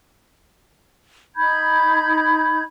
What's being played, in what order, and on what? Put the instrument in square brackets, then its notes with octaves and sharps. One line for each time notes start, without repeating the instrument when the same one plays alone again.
[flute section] D#4 B5 G6 G#6